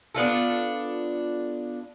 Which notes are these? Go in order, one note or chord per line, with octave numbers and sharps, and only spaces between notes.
B3 D4 F4 A4